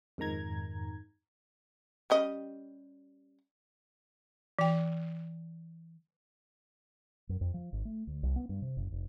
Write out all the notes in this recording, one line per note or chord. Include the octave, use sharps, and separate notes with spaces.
F2 G#2 D#3 A#5 G#6
G3 C#4 D#5
E3 G5
F#2
F2
F3
G#1
A3
D2
C2
B3
G2
C3
F#1
F1